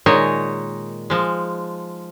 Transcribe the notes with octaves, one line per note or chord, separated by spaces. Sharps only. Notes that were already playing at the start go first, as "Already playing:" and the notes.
A#2 D#3 G#3 D#4 C#5
F3 G#3